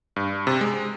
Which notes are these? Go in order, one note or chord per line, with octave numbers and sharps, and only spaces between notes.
G2
C3
G#3